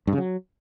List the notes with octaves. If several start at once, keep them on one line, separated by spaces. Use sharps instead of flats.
G2
C#3
F#3